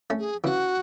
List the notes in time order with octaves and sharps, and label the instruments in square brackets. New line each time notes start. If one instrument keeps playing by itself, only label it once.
[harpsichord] A3 C#4
[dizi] G#4
[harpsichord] C#3 E3 [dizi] F#4